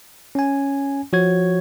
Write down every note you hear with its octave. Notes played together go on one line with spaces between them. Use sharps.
C#4 G#5
F3 F#4 C#5 G#6